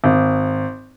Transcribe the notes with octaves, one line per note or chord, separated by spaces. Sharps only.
G#1